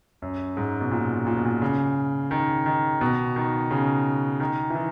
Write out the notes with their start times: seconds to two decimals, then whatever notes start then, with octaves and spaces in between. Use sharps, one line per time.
0.22 F#2
0.57 G#2
0.81 B2
0.92 A#2
1.27 A#2
1.36 B2
1.45 A#2
1.62 C#3
2.31 D#3
2.66 D#3
3.01 B2
3.36 D#3
3.71 C#3
4.40 D#3
4.70 E3
4.75 D#3